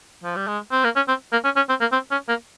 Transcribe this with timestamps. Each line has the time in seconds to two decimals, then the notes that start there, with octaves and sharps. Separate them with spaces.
0.24 F3
0.36 G3
0.47 G#3
0.72 C4
0.84 A#3
0.96 C#4
1.08 C4
1.32 A#3
1.45 C#4
1.56 C#4
1.69 C4
1.81 A#3
1.92 C4
2.11 C#4
2.29 A#3